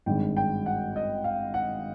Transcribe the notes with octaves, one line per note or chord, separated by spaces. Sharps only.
G#1 G2 D#3 G#3 G5
G5
F#5
D#5
F5
F#5